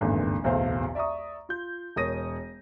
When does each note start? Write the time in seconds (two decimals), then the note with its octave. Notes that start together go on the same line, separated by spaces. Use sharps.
0.01 G#1 E2 G2 A#2 D3
0.44 D1 B1 E2 A3 C5 F5
0.95 D5 E5 A#5 C#6 D#6
1.49 F4 G6
1.96 E1 A#4 C#5 D#6 A#6 D#7